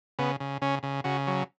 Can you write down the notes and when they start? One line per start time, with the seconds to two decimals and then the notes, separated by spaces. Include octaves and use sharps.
0.19 C#3 B3
0.40 C#3
0.62 C#3 C#4
0.83 C#3
1.04 C#3 F#4
1.27 F#3